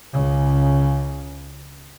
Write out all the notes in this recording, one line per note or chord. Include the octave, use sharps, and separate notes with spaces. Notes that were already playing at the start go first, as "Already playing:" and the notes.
C#2 C#3